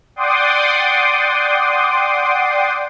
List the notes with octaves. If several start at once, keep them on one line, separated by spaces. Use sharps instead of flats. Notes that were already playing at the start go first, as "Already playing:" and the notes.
D5 F#5 G5 C6 D6 D#6